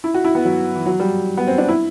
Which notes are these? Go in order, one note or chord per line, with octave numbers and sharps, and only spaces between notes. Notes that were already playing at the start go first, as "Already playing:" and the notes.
E4
F#4
E4
B3
F#3
E3
F#3
G3
B3
C4
D4
E4